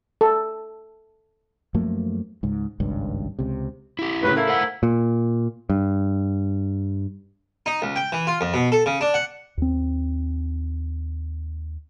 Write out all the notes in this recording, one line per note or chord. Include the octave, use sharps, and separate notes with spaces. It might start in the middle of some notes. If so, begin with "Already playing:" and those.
A4
F#2 F3 A3 A#3
C#2 G#2
G#1 C#2 G2
C#2 C3
E4 G4
A2 C#3 B4
A3 E4 A#4 F5
A4 C5 F#5
A#2
G2
D#4
C#2
G5
E3
F4
F2
B2
A4
C#3
D4
F#5
D#2 C4